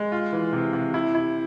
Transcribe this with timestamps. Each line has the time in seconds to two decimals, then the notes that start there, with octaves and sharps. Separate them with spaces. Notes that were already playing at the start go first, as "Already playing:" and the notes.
Already playing: G#3
0.12 F4
0.32 E3
0.53 C3
0.73 C3
0.94 E4
1.15 E4